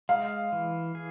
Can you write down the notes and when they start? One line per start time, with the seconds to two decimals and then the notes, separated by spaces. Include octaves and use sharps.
0.09 G#3 F5
0.52 E3
0.95 G#4